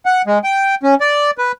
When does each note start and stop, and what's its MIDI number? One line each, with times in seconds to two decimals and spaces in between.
0.06 0.22 78
0.27 0.39 56
0.44 0.75 79
0.83 0.94 61
1.01 1.31 74
1.38 1.52 71